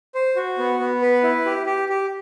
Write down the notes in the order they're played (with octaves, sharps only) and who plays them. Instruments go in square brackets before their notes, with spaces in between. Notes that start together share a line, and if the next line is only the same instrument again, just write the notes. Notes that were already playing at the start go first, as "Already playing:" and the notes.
[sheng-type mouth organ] C5
F#4
B3
B3
B4
E4
G4
G4
G4